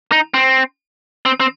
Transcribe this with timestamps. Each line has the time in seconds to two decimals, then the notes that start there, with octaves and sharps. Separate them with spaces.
0.12 D#4
0.34 C4
1.26 C4
1.40 C4